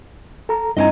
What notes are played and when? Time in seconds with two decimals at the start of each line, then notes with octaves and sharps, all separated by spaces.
0.49 A4 A#5
0.77 G2 C4 D#4 E4 D#5 G#5 A#5